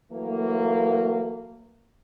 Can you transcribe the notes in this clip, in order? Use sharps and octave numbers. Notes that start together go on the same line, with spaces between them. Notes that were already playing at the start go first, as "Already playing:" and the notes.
E3 F#3 A3 A#3